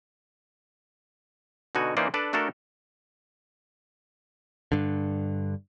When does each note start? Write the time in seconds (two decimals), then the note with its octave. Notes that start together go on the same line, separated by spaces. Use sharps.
1.75 B2 D3 D#4 F#4 G#5
1.97 E3 A#3 C#4 D#4 C5 D5
2.14 D4 A4 B4 D5
2.33 A3 D4 F#4 A4 A#4
4.72 G2 D3